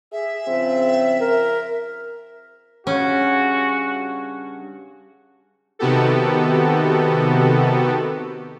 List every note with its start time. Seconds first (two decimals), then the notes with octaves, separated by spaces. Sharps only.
0.12 G#4 E5
0.47 C#3 F3 C4
1.21 A#4
2.87 G2 C#3 C#4 F#4 F#5
5.79 C3 D#3 B3 F#4 G4 A4